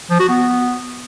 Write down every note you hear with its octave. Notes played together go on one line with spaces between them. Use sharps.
F3
F#4
B3